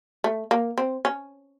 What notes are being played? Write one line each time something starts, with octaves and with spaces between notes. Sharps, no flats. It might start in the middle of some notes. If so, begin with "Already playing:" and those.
A3
A#3
C4
C#4